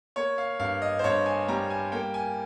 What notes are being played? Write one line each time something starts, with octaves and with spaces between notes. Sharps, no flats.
A#3 C#5
F5
G2 F5
D#5
C5
G2 C#5
G#5
G3 A#5
G#5
A#3 G5
G#5